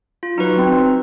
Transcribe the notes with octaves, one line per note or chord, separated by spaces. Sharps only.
F4
F#3 D#4 F#4 B4
C4